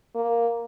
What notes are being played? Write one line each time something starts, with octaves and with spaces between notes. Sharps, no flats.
A#3